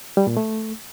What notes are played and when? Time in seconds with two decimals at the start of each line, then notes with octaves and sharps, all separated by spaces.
0.17 G3
0.27 A#2
0.37 A3